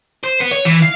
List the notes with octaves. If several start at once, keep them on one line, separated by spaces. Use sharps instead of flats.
C5
B3
C#5
E3
F5